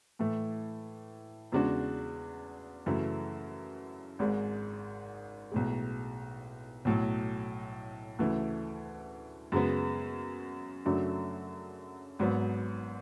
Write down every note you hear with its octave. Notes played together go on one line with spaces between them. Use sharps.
A2 E3 A3
E2 C#3 G#3 D4 F#4
F#2 C#3 E3 A3
G#1 G#2 G#3
B1 A2 G#3
B1 A2 F#3
D2 C#3 E3 A3
F#2 C#3 G#3 B3
F#2 C#3 F#3 A3 D4
G#1 G#2 F#3 B3